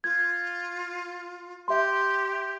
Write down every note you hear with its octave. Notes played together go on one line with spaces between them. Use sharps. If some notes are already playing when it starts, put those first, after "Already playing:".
F4 G#6
G4 E5 C6